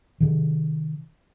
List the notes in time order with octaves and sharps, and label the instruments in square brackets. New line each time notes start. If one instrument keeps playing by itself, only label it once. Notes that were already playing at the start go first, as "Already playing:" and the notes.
[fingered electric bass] C3 D#3